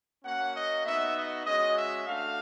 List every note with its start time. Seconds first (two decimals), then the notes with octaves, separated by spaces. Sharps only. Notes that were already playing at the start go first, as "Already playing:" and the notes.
0.24 A#3 C#4 F#4 F#5
0.55 D#5
0.84 B3 D#4 F#4 E5
1.15 D#5
1.44 G#3 C#4 F#4 D#5
1.76 E5
2.05 A3 D4 F#4 F5